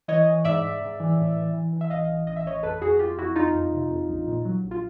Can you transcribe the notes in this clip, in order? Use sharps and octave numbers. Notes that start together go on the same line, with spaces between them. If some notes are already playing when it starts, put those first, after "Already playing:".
E3 C#5 D#5
E3
G#2 D5 E5
G#2
G#2
E3
A2
E3
E3
E3
E5
A1 D#5 F5
E3
A1 D#5
E5
A1 C#5 D#5
F2 A4 B4
F2 F#4 G#4
F2 F4 G4
F2 E4 F#4
F2 D#4 F4
F2
C3
F2
A#1
A#2
F#3
A#1
F4